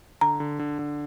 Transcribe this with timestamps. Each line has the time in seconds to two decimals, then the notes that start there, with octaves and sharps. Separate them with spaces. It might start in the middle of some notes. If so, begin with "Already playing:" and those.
0.21 D3 A#5
0.40 D3
0.59 D3
0.79 D3